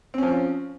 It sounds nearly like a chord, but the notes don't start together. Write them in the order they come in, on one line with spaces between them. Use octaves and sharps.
C4 C#4 F3